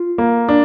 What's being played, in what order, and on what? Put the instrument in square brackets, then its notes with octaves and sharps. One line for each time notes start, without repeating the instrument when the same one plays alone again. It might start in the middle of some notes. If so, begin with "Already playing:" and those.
Already playing: [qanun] F4
[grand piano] A#3
D4